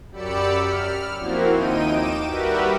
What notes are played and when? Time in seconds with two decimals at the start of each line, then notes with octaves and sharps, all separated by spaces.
0.12 F#2 G4 D5 B5 E6 C#7
0.60 F6
1.18 F3 A#3 C4 E4 F#4
1.53 D#2 D#4 G5 D#7
1.89 D6 D7 E7
2.26 G3 F#4 G4 A#4 B4 E5